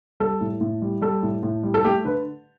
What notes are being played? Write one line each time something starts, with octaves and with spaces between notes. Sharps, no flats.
G3 A4
A2
A2
G3
G3 A4
A2
A2
G3
A4
A3 G4
D3 B4